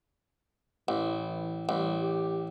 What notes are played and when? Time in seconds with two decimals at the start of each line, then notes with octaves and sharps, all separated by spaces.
0.88 A1 E3
1.69 A1 G3
2.00 G4